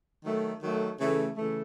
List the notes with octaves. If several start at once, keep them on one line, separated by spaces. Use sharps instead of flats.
D#3 F#3 A3
D#3 F#3 A3
C#3 E3 A3
C#3 E3 A3